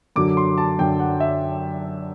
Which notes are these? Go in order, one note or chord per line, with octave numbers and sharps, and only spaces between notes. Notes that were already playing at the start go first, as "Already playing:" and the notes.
F#2 D3 F#3 D6
C6
A5
F#2 D3 F#3 G5
F#5
E5